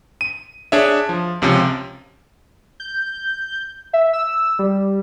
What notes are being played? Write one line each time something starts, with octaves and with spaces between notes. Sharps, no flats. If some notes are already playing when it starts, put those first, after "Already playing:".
D#7
D4 G#4 C#5 E5
F3
C#2 C3 F3 C#4
G6
E5
E6
G3